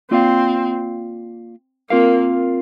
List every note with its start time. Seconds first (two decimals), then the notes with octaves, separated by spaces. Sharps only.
0.10 A#3 C4 F4 D5 F5
1.90 A#3 C4 F4 A#4 F5